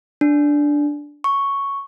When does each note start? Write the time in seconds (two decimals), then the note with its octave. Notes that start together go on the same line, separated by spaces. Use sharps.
0.21 D4
1.24 C#6